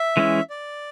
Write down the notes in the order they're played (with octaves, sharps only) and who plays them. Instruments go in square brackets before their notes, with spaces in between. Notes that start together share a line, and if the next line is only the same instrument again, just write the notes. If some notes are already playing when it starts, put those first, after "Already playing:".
Already playing: [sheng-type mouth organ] E5
[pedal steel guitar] E3 G#3 C#4 E4
[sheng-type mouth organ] D5